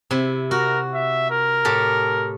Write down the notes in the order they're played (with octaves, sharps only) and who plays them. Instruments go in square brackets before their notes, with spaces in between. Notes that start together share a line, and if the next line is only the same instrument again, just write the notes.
[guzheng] C3 E4
[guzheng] F#4 [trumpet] A#4
[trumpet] E5
A#4
[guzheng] A2 G4 A4